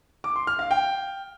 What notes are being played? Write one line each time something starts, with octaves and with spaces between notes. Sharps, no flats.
D6
C6
F6
F5
G5